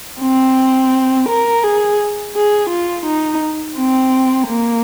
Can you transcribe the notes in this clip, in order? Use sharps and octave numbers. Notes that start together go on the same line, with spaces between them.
C4
A#4
G#4
G#4
F4
D#4
C4
A#3